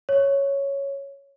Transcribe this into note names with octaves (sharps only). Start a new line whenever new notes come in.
C#5